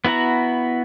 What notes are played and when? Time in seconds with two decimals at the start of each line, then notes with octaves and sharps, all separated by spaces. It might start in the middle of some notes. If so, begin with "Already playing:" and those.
0.05 B3 E4 F#4 A#5